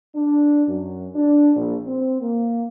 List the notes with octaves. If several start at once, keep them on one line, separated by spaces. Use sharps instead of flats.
D4
F#2
D4
A#1
C4
A#3